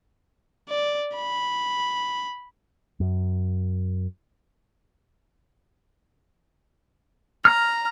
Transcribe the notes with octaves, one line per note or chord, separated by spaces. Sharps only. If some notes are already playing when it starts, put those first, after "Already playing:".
D5
B5
F#2
A#5 F6